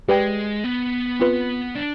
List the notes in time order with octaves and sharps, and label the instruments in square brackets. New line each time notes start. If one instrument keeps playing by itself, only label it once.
[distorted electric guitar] G#3 [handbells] G4 B4 D5 G5
[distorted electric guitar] B3
[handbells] C4 F4 B4
[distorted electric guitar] D4